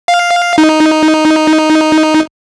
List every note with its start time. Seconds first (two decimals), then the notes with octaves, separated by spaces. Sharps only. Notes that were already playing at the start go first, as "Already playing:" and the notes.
0.08 F5
0.58 D#4